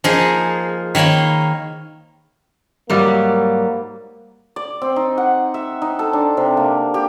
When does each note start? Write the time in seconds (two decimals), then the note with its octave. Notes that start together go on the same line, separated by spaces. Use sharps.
0.04 F3 A#3 D#4 G#4
0.95 D#3 A#3 C#5 B5 C6
2.90 G#2 F#3 G3 A#3
4.56 D5
4.82 C4
4.96 D#4
5.18 F#5
5.54 E5
5.82 D#4
5.99 A4
6.13 D4
6.37 C3
6.57 A#3
6.94 G4